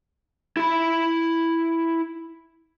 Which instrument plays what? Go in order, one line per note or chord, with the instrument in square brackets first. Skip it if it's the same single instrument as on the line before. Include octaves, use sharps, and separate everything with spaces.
[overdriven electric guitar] E4 B5